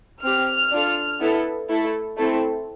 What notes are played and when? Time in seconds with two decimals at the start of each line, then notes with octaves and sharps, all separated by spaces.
0.23 C4 G4 F6
0.71 D4 F4 A4
1.20 B3 E4 A4
1.69 A3 E4 A4
2.17 A3 C4 E4 A4